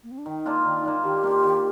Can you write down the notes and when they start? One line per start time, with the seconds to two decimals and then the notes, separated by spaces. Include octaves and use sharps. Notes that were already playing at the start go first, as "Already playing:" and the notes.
0.03 A#3
0.11 C4
0.18 D4
0.26 D#3 D#4
0.46 A#3 D4 F4
0.65 D#3
0.84 A#3 D4 F4
1.03 D#3 G4
1.23 A#3 D4 F4
1.43 D#3